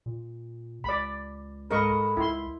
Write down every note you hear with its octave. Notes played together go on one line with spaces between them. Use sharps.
A#2
C#2 D5 B5
G#2 A4 A#4 D#5 A5 B5 C#6
C#2 E4 C6